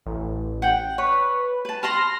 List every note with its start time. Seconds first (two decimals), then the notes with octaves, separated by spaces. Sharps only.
0.06 A1
0.62 F#5 G5
0.98 B4 C#5
1.65 B4 A5
1.83 A5 B5 C6 F6 A#6